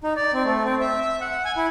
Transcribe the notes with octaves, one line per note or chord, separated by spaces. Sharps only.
D#4
D5
C4
A3
C4
E5
E5
F#5
G#5
E4